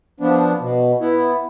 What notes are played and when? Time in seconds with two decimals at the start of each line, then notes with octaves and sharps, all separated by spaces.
0.20 F3 B3 D4
0.60 B2
1.00 B3 E4